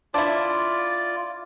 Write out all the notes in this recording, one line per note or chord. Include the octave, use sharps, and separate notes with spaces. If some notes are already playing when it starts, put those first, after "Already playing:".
D4 E4 F4 D5